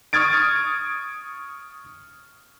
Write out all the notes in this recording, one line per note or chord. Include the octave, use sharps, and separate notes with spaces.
C#6 D#6 F6 G#6 A6 D7